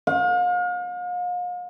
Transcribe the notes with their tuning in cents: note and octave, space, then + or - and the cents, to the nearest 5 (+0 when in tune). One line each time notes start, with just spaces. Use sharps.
F5 +40